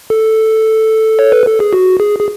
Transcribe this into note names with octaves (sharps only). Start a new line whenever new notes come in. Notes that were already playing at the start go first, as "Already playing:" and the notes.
A4
C#5
B4
A4
G#4
F#4
G#4
G#4